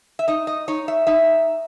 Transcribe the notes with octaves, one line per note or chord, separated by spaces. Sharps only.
E5
D#4 D#5
D#5
D#4 C#5
E5
D#4 E5